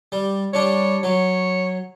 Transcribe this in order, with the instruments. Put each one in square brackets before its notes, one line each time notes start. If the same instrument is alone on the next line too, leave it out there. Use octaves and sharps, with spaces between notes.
[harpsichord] G3
[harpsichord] G3 D4 [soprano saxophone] C#5
[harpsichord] F#3 [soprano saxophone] C#5